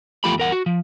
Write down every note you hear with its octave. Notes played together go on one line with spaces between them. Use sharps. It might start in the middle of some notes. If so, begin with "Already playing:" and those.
E2 F3 A3 F4 G4 B5
E2 A#4 F#5
F#4
F3